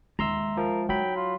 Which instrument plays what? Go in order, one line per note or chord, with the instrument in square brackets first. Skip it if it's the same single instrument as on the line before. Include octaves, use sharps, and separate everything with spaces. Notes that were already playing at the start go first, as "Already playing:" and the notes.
[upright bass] D#2 [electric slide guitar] G#3 E5 [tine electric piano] A#5 C6 E6
[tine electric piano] F3 [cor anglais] A#4
[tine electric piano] F#3 B5 [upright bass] D#4 [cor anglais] G5
[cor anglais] F4